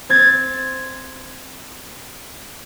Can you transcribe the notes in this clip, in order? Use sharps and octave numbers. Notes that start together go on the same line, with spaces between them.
C4 G#6 A6